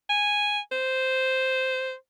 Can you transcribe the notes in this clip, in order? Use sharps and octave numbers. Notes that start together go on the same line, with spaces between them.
G#5
C5